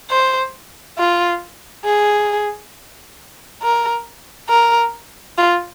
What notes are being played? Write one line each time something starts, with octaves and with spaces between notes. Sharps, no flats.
C5
F4
G#4
A#4
A#4
F4